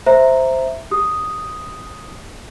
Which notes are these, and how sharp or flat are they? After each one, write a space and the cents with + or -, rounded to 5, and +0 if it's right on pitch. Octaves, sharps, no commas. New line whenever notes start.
C5 +0 E5 +0 A#5 +0
G4 +0 D#6 +0